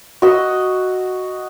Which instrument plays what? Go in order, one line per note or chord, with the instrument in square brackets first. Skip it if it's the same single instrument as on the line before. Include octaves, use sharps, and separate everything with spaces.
[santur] F#4 D#5 E6